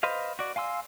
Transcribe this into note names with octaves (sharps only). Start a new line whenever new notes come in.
B4 C5 D#5 F5
F#4 D5
F5 G#5 C6 E6